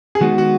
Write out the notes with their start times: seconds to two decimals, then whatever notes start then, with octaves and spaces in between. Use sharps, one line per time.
0.15 G#4
0.21 D#3 G#3 B3 D#4 F#4
0.38 F#4